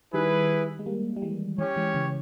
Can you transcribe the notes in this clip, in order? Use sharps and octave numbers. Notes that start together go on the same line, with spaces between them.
D#3 G3 E4 G#4 B4
G#3
G3 A#3
G3
E3 G#3
E3 G#3 C#4 G4 C#5
E3 G#3
C#3 E3